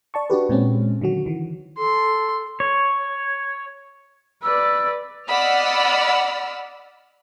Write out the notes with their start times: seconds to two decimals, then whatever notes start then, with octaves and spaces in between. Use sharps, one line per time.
0.14 D5 A5 C#6
0.30 D4 F#4 G4 B4
0.49 A#2 G#3 C4 C#4
1.01 D3 D#3 F#3 F#4
1.26 D#3 E3
1.78 A4 C6
2.60 C#5
4.43 B4 D5 E6
5.29 D5 D#5 F#5 B5 E6 F6